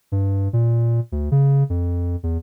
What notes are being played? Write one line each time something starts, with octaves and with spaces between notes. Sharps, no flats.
G2
A#2
D2
C#3
F2
E2